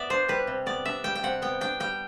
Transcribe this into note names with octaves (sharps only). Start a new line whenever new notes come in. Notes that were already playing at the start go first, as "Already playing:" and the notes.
Already playing: B3 D5 E5
D4 C5
G3 B4
C3
B3 D5
D4 E5
G3 G5
G5
C3 F#5
B3 G5
D4 G5
G3 G5